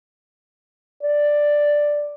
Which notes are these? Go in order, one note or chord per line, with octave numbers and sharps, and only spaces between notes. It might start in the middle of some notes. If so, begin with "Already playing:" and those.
D5